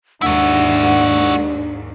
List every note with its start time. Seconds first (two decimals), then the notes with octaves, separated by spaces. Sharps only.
0.22 D#2 G#2 D4 E4 F#4 F#5